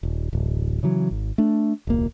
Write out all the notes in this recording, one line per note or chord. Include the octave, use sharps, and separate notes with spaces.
D#1
D1 A1
C#3 E3 F#3
G#1
A3 D4
E1 C#2 A#3